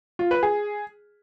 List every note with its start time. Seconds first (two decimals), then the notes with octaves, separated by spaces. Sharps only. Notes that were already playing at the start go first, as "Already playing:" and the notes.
0.19 F4
0.31 B4
0.43 G#4